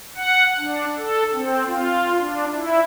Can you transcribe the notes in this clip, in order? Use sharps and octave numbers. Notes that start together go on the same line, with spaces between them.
F#5
D4
A4
C4
F4
D4
E4